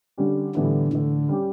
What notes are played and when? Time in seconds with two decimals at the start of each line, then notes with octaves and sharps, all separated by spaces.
0.18 D3 G3 C#4 G4
0.55 A2 D3 E3 G3 B3 E4
0.91 A2 D3 E3 A3
1.29 G3 C#4 G4